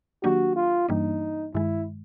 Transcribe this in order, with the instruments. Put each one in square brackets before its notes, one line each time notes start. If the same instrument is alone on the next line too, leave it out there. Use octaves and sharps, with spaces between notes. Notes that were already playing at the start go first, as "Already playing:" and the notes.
[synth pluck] D#3 F#3 A#3 D4 G4 [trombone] F#4
[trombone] F4
[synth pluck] G2 E3 G3 A#3 D4 [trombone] D#4
[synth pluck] G2 D#3 G#3 [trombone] E4